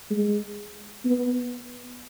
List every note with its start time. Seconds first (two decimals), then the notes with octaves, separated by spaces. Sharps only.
0.10 G#3
1.05 B3